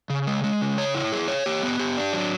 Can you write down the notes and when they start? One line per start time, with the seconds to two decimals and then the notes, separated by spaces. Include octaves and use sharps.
0.10 C#3
0.27 G#3
0.44 G#3
0.61 C#3
0.78 C#5
0.94 E4
1.12 G#4
1.28 C#5
1.46 G4
1.63 B3
1.79 G4
1.97 D4
2.13 F#3